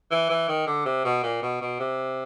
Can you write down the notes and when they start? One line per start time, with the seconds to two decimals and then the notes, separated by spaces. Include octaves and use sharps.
0.11 E3
0.30 E3
0.48 D#3
0.67 D3
0.86 C3
1.05 B2
1.23 A#2
1.42 B2
1.61 B2
1.80 C3